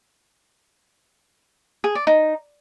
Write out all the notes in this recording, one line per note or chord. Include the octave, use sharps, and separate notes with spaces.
G#4
D5
D#4